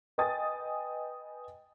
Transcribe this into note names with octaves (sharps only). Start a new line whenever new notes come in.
B4 D#5 G5 G#5 D#6 A6